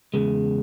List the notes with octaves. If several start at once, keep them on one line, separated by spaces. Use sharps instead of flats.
E2 C#3 G#3